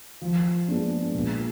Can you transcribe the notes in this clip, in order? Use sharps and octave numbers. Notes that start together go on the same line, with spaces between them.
F3
G#3 B3 D4
A#2